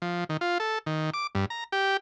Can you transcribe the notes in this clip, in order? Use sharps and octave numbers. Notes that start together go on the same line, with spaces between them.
F3
D#3
F4
A4
D#3
D6
G2
A#5
G4